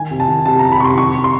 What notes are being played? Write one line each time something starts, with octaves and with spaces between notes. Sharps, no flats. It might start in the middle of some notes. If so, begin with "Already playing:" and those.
Already playing: D#3 G#5
C3
A5
D#3
C3 A5
D#3 A#5
B5
C3 C6 C#6
D#3 C#6
C3
C6